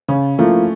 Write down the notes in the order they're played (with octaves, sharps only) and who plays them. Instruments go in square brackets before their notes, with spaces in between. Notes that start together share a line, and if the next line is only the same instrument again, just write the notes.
[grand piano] C#3 [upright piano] C#4
[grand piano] F3 A#3 E4 [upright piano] A3